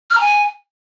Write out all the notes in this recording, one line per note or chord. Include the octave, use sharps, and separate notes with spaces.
F6
A#5
G#5